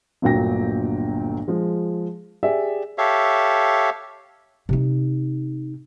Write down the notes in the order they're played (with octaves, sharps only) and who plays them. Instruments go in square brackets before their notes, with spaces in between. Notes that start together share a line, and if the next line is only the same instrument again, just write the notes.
[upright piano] G1 D2 A#2 F#3 G5 A#6
F3 G#3
G4 G#4 D5 E5
[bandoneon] G4 A4 C#5 E5 F5
[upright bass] C3 D#4